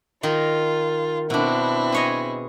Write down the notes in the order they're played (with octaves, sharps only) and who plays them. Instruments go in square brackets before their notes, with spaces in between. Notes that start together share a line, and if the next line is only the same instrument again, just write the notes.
[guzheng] D#3 D#4 A#4 [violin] F4
[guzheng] B2 D4 [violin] C4 E4
[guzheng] G#4 C#5 D#5